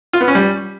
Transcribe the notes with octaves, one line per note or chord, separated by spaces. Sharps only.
F4
B3
C#4
G3